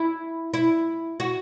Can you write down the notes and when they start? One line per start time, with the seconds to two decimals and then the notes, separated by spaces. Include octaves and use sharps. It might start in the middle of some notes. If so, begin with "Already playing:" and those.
Already playing: E4
0.54 E4
1.20 F#4